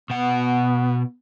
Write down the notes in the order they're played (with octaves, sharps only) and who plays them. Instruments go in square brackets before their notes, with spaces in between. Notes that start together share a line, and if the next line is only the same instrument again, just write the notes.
[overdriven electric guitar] B2 F#5 [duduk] B3